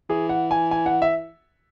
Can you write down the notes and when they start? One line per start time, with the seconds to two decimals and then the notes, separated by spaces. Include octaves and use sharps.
0.09 E3 G#4
0.29 F#5
0.51 G#5
0.71 G#5
0.86 F#5
1.02 E5